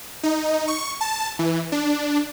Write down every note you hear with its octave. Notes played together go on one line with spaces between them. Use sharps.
D#4
C#6
A5
E3
D4